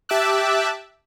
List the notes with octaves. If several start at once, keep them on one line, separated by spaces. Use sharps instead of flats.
G4 E5 A5 D6 E6 F#6